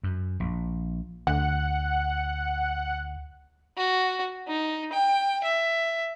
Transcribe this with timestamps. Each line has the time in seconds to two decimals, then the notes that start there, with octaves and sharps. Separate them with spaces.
0.03 F#2
0.40 A#1
1.27 D2 F#5
3.77 F#4
4.47 D#4
4.92 G5
5.44 E5